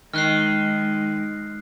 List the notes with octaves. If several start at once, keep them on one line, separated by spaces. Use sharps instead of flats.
D#3 G#3 F6 F#6 C7